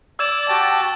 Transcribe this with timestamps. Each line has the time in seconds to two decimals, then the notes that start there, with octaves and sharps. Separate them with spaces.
0.19 D5 E6 G#6 E7
0.49 F#4 G4 G5 A5 A6